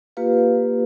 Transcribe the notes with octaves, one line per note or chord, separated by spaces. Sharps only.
A#3 F4 G4 B4 F5